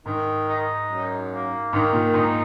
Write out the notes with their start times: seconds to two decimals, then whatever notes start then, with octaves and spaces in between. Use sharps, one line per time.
0.05 G#2 D#3
0.47 D#4
0.89 F#2
1.30 A#3
1.73 G#2 D#3
1.93 A#2
2.14 G#2 D#4